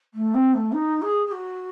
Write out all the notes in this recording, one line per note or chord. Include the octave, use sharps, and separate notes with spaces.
A3
C4
A3
D#4
G#4
G#4
F#4